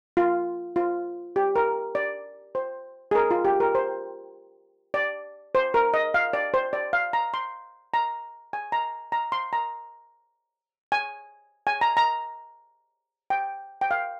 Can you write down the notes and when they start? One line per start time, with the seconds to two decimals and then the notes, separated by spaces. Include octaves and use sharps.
0.17 F4
0.76 F4
1.36 G4
1.56 A#4
1.95 D5
2.55 C5
3.11 G#4
3.15 A#4
3.31 F4
3.45 G4
3.60 A#4
3.75 C5
4.94 D5
5.55 C5
5.74 A#4
5.94 D#5
6.14 F5
6.33 D5
6.54 C5
6.73 D5
6.93 F5
7.13 A#5
7.34 C6
7.94 A#5
8.53 G#5
8.72 A#5
9.12 A#5
9.32 C6
9.53 A#5
10.92 G#5
11.67 G#5
11.81 A#5
11.97 A#5
13.30 G5
13.81 G5
13.91 F5